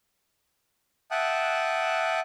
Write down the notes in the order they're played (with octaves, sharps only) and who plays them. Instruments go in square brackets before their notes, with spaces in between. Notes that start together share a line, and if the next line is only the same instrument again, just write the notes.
[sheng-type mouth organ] E5 F#5 G5 A5 D#6 F#6